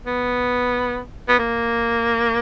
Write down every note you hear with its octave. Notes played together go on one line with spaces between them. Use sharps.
B3
B3
A#3